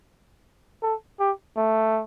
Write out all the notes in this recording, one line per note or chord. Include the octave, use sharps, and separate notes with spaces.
A4
G4
A3